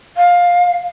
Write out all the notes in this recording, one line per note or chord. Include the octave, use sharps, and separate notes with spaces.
F5